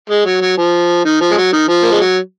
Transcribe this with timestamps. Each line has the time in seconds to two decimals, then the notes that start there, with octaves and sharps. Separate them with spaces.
0.09 G#3
0.25 F#3
0.41 F#3
0.57 F3
1.05 D#3
1.21 F3
1.31 G#3
1.37 F#3
1.53 D#3
1.68 F3
1.83 A#3
1.92 G#3
2.01 F#3